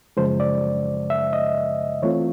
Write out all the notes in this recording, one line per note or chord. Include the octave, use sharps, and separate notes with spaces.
F#2 C#3 F3 G#3 C5
D5
E5
D#5
E3 A3 C4 F4 C#5